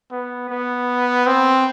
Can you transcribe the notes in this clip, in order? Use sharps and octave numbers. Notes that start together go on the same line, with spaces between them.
B3
B3
C4